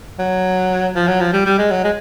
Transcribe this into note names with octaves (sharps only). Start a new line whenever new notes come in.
F#3
F3
F#3
F3
G3
G3
G#3
F#3
G#3